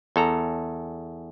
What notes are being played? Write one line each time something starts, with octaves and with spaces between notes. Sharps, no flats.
E2 A4 A#5